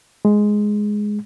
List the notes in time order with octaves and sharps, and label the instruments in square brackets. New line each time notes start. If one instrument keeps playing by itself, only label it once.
[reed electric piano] G#3